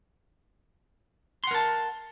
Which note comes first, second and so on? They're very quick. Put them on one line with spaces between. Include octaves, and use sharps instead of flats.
C6 F#5 A#4 A5